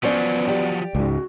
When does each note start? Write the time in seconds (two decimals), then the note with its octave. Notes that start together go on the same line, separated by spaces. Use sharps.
0.03 F3 F#3 B3 C#4 C5 D5
0.48 G4 D5
0.95 C#2 G#2 F#4